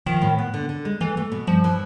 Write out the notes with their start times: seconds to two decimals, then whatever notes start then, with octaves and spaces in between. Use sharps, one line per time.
0.06 D#3 F3
0.22 A2
0.39 B3
0.54 D3
0.69 D3
0.85 G#3
1.01 E3 A3
1.17 A3
1.32 B2
1.47 G2 F3
1.64 E3